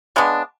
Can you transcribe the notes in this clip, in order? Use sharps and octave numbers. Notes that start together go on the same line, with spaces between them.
C#3 G#3 B3 D4